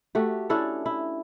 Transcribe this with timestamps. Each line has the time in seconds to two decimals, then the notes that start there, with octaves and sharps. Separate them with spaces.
0.15 A3 F#4 G4
0.50 C#4 D4 E4 A4
0.86 E4